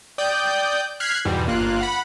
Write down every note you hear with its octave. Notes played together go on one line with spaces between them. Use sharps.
D5 G5 D#6 G6
F6 F#6 G#6 B6 C7
E2 G#2 B2 G3
G1 A#3 F4 F5 F#6
F#5 B5